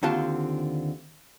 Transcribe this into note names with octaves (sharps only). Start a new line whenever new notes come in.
D#2 D3 C4 F4 F#4 A5